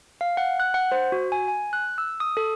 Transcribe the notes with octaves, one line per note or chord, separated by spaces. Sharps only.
F5
F#5
F#6
F#5
C5
F#4
G#5
G#5
F#6
E6
D#6
A4